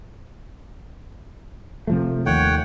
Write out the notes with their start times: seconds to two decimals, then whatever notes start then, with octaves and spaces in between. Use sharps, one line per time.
1.87 C3 F3 A3
2.26 D#2 D#3 A3 C#5 F#5 G5